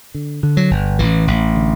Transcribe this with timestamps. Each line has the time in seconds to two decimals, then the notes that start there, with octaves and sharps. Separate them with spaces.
0.14 D3
0.43 D3
0.57 F#3
0.71 G1
0.99 A1 E3
1.27 A1
1.55 D3